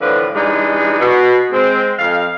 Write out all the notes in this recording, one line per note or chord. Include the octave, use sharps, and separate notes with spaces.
A2 D3 E3 F3 B4
E3 G3 G#3 D4 D#4
B2
G#3 C4
F2 F5